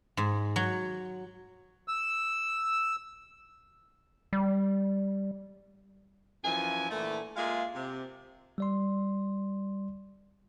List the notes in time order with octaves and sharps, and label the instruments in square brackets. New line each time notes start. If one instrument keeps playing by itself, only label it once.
[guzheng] G#2
F#3
[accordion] E6
[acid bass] G3
[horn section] F#2 E3 F3 E4 G#5
A#2 D3 E3 A3
G#3 A#3 F4 G#4 E5 F5
C3
[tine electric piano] G3 D5 C6